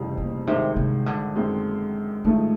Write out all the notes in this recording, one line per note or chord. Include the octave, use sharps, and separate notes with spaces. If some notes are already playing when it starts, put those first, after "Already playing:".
Already playing: F1 F2 C#3 E3 G3
A#2
G#1 G2 C3 D#3 G#3
C3
D3
F#2 D#3 G#3 C4
A1 G#2 D#3 F3 A3